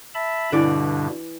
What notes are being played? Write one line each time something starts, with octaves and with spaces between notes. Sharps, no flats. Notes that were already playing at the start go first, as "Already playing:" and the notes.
E5 A5 B5
G2 B2 D3 E3 G3 D5